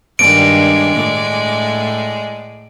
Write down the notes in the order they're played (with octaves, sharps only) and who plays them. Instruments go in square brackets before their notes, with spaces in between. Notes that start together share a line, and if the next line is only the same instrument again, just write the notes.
[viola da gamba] G2 D#3 [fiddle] G#3 D5 [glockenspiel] D7
[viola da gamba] A2